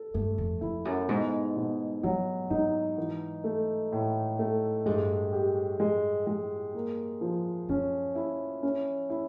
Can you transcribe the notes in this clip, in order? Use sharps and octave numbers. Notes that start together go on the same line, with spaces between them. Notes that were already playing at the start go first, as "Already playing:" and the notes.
Already playing: A4
G2 A3
F2
F2 E4
F#2
G#2 B2
B2
G#2 F#3
G#2 D#4
E3
A3
A2
A3
G2 G#3
G4
G#3
G#3
A#3
F3
F#2 C#4
E4
C#4
E4